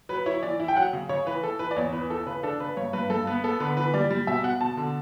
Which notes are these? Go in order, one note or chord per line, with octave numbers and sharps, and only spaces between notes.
F#3 B4
E4 C#5
E3 D5
E4
G5
F#3 F#5
C#3
C#3 C#5
E3 B4
E3 A4
E3 B4
D5
E2 C#5
E3 B4
E3 A4
C#3 B4
D4 A4
C#3 B4
G2 C#5
G2 B4
G2 A4
B3 B4
B3 A4
D3 B4
E3 B4
G3 D5
G3
B2 E5
B2 F#5
B2 A5
D3